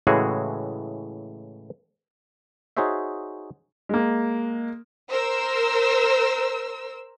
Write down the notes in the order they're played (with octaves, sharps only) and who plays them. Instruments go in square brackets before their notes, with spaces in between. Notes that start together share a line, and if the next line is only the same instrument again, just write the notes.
[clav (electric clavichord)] A2 C#3 E3 G#3 F#4 G#4
D#4 F#4 G#4 C5 C#5 E5
[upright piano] G#3 A#3
[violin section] A#4 C5 E6